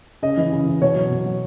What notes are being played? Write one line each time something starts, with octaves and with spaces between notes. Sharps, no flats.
C#3 D#5
E3
C#3
E3
B2 C#5
F#3
B2
F#3